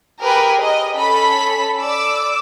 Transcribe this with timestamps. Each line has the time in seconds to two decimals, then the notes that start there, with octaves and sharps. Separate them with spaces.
0.20 G4 G#4 A#4 B4 G5
0.61 D#5
0.98 C#4 A4 B5 B6
1.81 D5 D6 E6